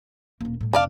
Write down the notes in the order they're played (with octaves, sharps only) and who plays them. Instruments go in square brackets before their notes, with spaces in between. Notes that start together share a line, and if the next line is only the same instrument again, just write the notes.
[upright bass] D#1 A#3
A2 G3
[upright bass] F1 [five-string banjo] D4 D5 F5